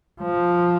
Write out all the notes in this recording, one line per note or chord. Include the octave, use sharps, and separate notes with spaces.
F3